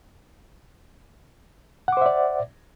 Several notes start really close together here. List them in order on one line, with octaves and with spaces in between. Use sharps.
F#5 D6 C5 E5 D5